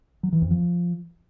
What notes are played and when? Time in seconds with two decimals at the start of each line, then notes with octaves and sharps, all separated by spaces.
0.23 F#3
0.32 E3
0.42 F2
0.51 F3